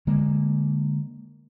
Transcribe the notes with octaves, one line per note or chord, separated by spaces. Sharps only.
D3 G#3 A#3